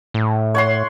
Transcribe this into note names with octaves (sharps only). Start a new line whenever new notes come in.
A2
C#5 F#5 C6